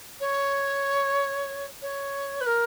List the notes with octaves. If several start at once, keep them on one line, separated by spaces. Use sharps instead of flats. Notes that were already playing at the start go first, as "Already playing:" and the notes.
C#5
C#5
B4
A#4